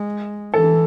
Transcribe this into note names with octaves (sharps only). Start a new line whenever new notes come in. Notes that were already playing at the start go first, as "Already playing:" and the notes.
Already playing: G#3
E3 A4